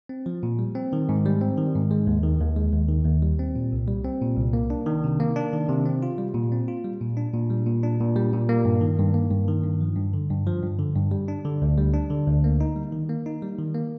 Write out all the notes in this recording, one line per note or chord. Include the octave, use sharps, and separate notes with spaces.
C4
F3
A#2
G3
C4
D#3
G#2
G3
C4
D#3
G#2
G#3
D#2
D#3
D#2
G#3
D#2
D#3
D#2
G3
C4
A#2
C2
G3
C4
A#2
C2
A#3
D4
D#3
C3
A#3
D4
D#3
C3
C4
F4
G3
A#2
C4
F4
G3
A#2
D4
A#2
G3
A#2
D4
A#2
G3
A#2
A#3
G2
D#3
G2
A#3
G2
D#3
G2
F3
G2
D3
G2
F3
G2
D3
G2
G3
D4
D3
D2
G3
D4
D3
D2
A#3
D#4
G3
D#3
A#3
D#4
G3
D#3
A#3